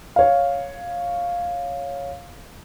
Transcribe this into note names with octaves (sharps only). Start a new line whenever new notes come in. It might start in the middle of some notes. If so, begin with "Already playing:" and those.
C#5 F5